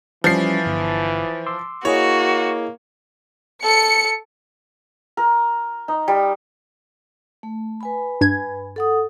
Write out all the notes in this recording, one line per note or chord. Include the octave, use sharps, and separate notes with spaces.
E3 F3 G3 C#4 C7
G1
C6 D6 E6
A#3 E4 F#4 G#4 C#5 D#5
A4 C#7
A#4
D#4
G3
A3
B4 G#5 B5
G2 G#6
A4 F#5 D#6